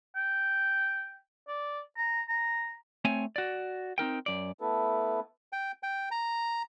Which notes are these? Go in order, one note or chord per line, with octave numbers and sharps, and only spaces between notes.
G5
D5
A#5
A#5
A3 C4 C#5 G#5
F#4 D5
C4 D#4 A#4 G5
F#2 D5
A3 B3 E4 A4 B4
G5
G5
A#5